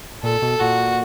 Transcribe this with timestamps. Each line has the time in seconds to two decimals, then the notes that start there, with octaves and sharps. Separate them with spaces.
0.23 A#2 A4
0.42 B2
0.60 A#2 F#4